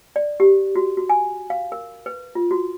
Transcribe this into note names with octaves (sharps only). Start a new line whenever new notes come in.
D5
G4
F#4
F#4
G#5
F5
A#4
B4
F4
F#4